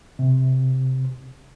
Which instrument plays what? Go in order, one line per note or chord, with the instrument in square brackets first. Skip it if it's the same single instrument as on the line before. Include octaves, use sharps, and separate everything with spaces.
[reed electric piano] C3